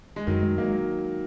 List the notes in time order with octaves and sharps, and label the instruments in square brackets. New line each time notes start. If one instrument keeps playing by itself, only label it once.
[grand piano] G#3
[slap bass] F#2 [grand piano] D#3 F#3
[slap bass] G#3
[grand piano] F#3 A#3 [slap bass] G#3